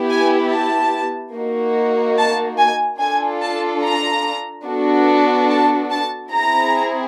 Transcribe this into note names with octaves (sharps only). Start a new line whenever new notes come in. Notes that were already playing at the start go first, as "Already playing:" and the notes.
Already playing: B3 E4 G4
G#5
A5
A#3 D#4 F#4
A5
G#5
D4 F4 A4 G#5
A5
A#5
B3 D4 F#4 A4
A5
A5
C4 E4 G#4 A#5